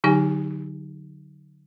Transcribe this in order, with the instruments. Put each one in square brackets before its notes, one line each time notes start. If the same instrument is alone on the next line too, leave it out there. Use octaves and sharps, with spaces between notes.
[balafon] D3 F#3 D#4 G4 G#5